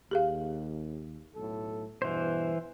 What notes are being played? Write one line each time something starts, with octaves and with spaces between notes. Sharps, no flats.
D#2 G4 G#4 F5
B1 A2 A4
E2 G2 B2 E3 C5